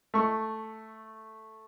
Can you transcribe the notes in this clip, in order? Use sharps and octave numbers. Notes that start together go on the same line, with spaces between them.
A3 C#6